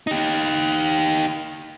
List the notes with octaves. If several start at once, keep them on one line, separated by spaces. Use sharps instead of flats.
D#4 G4